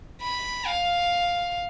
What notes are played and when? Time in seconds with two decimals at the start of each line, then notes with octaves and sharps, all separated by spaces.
0.22 B5
0.66 F5